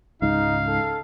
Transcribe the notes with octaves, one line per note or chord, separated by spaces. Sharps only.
C#2 G#2 D#4 F5
A4